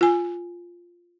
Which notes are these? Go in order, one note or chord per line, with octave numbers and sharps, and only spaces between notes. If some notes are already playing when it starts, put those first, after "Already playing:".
F4 G#5